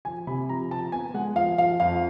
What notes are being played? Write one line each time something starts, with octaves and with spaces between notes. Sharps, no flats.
F3 G#5
C3 B5
F3 A#5
F3 A5
B3 G#5
G#3 F#5
F3 F5
F3 F5
F2 F5